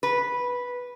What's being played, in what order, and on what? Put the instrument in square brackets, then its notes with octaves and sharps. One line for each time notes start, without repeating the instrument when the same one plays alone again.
[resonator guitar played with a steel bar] B4